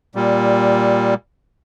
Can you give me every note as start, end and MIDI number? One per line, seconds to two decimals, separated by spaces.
0.15 1.14 46
0.15 1.14 55